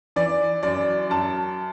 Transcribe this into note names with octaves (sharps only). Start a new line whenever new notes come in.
E3 D5
F#2 D5
F#2 A5